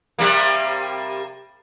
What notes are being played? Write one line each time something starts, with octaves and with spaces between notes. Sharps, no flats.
C3 G3 A#3